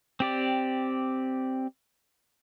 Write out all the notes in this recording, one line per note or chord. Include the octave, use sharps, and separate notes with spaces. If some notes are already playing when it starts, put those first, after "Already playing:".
C4 G4 D5